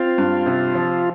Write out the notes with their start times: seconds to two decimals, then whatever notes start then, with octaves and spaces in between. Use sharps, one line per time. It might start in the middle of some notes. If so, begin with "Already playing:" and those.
Already playing: C4 F4
0.18 G2
0.46 C3
0.75 F3